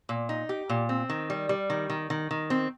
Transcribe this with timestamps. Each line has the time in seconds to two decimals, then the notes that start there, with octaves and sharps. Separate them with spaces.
0.09 A#2
0.29 D#4
0.49 G4
0.69 A#2
0.89 C4
1.10 D#3
1.30 G3
1.49 G3
1.70 D#3
1.90 D#3
2.10 D#3
2.31 D#3
2.50 C4